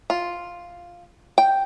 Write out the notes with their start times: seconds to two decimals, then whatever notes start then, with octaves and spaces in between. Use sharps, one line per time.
0.10 F4
1.38 G5